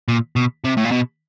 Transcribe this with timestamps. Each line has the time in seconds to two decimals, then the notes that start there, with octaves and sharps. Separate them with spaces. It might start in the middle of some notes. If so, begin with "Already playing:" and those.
0.08 A#2
0.36 B2
0.65 C3
0.77 A2
0.85 A#2
0.92 B2